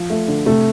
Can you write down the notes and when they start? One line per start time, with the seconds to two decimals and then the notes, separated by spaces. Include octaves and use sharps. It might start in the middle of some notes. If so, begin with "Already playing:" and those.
Already playing: F3
0.10 A3
0.28 D3
0.46 C3 A3